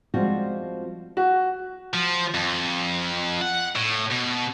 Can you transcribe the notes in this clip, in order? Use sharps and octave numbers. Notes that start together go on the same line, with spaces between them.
F3 G3 G#3 C4 F4 F#4
F#4
F3
F2
F#5
A2
B2